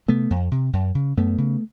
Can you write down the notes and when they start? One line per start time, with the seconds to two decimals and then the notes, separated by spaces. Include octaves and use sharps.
0.08 C3 A3 B3
0.30 F2
0.52 C3
0.73 F#2
0.95 C#3
1.17 F#2 A3 B3
1.38 C#3